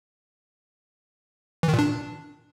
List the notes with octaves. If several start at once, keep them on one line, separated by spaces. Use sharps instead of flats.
E3
D#3
A#2
D4